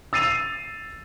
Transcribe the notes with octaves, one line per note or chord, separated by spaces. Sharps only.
E6 A6 C7 D#7 F7